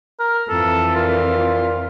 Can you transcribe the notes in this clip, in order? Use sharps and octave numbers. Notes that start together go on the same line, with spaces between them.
A#4
F2 E3 A4
A#2 F4